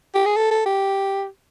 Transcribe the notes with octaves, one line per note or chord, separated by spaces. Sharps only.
G4
G#4
A4
A4
G4